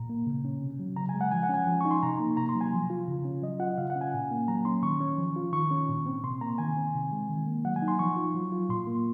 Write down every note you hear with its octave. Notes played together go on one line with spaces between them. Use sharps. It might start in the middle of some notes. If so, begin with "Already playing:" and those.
Already playing: A#2 A#5
A#3
C#3
C#4
C3
F#3
C#3 A#5
G#5
G#3
F#5
F3 G#5
F#5
C#4 G#5
F3
D#4 C#6
C6
C3 A#5
A#3
C3 A#5
C6
F#3
G#5
F3
F4
C#3
C#4
F#3 D#5
F4 F#5
C#3 F5
F#5
C#4
G#5
A#2
A#3
F#3 A#5
C#4 C6
D#3 C#6
C#4
F3
F4
D#3 C#6
C#4
A#2
C4
C3 C6
A#3 A#5
D#3 G#5
C4
C3
G#3
D#3
A#3
F#3 F#5
G#5
D#4
C6
F3 C#6
F4
F#3
F4
A#2 C6
A#3